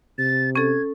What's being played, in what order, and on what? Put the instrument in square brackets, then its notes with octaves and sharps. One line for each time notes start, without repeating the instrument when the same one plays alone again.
[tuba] C3 [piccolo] A6
[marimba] C#4 A4 [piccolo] G#6